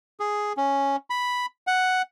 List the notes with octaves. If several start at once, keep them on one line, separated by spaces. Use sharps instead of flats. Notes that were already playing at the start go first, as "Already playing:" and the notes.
G#4
C#4
B5
F#5